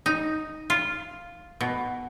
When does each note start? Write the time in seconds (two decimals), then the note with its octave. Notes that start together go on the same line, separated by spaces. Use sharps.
0.06 D#4
0.70 F4
1.61 B2